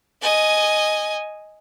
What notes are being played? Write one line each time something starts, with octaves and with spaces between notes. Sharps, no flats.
D#5 G#5